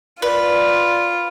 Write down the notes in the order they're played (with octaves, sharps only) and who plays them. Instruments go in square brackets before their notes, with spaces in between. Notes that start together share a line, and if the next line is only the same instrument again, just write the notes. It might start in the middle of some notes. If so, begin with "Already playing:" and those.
[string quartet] F4 [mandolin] B4 [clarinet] D5